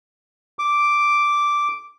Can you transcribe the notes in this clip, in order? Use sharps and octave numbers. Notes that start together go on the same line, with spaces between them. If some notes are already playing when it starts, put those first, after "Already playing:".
D6